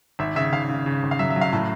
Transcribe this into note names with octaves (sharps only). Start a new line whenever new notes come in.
G#1 E5
C#3 E5
G#1 F5
C#3
C#3
G#1
F5
F#3 E5
E5
F#3
F5
A2 A5